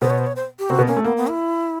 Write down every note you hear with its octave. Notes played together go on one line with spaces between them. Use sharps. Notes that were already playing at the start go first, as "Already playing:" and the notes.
B2 B3 C5
C#5
C5
C#5
C5
G4
C3 C4 F#4
B2 B3
A#3 C#4
A3
A#3 B3
B3
E4